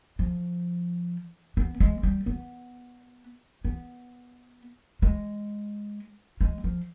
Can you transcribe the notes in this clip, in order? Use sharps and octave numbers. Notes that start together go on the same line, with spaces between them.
F3
B3
G#3
G3
B3
B3
G#3
G#3
F3